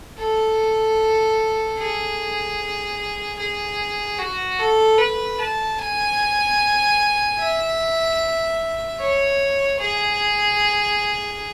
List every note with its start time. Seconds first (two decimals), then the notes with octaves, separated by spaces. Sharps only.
0.19 A4
1.78 G#4
3.39 G#4
4.19 F#4
4.59 A4
4.98 B4
5.39 A5
5.78 G#5
7.39 E5
8.99 C#5
9.80 G#4